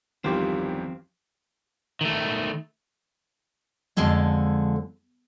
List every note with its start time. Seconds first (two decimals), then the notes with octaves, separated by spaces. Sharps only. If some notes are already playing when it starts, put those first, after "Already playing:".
0.24 G1 E2 D#3 F3 G3 C4 F4 G4
2.01 D#3 A3
3.97 F2 D3 F3 G#3 A4 C#5